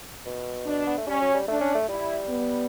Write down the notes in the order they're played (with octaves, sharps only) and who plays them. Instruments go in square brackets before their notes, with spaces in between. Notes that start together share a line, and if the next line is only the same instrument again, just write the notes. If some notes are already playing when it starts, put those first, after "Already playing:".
[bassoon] B2
[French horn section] D4
[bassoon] B3
A3
[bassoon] G3 [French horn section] C#4
[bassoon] F#3
G3
[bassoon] A3 [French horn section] D4
[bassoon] C#4
A3
[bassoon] G3 [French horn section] E4
[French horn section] B3